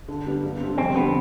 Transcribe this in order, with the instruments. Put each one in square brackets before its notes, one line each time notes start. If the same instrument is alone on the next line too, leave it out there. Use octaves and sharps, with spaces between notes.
[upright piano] D3
G3 B3 D4
G2
D3 G3 C4
[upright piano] F2 [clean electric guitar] C4
[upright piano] D3 G3 C4 [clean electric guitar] B3